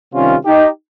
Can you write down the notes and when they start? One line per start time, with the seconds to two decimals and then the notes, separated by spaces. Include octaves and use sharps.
0.14 C3 D#3 G3 C#4 F4
0.46 D#4 G4